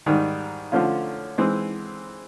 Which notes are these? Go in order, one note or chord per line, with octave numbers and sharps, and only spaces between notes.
G#2 D#3 G3
D3 F3 A3 C#4 F4
E3 G#3 C4